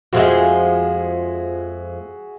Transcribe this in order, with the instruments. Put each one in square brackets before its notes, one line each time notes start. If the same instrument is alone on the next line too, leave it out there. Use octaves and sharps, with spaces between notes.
[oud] F2 F3 G#3 [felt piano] F#4 G#4 E5